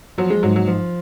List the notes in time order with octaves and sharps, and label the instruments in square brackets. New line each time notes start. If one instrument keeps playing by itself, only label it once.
[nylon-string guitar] F3 [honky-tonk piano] F#3
[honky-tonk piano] G#3
[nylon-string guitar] G#2 [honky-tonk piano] F#3
[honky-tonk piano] F#3
[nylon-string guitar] F3